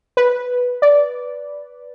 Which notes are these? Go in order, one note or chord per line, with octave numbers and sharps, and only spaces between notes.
B4
D5